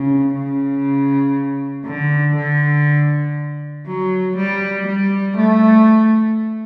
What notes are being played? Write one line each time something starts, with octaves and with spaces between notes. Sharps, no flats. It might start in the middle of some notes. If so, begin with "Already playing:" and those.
Already playing: C#3
C#3
D3
D3
F#3
G3
G3
A3